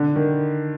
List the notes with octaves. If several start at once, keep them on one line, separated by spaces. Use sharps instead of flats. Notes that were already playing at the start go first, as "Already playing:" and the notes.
Already playing: D3
D#3